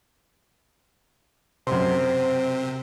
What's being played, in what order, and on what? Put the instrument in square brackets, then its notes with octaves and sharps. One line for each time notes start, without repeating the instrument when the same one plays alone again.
[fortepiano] F#2 C6 [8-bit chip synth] C3 [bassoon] C4